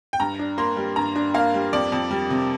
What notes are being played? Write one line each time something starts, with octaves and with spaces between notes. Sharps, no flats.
G5
G2 A#5
D4
A#3 C6
G3
G2 A#5
D4
A#3 F5
G3
F2 D5
F2
G3
C3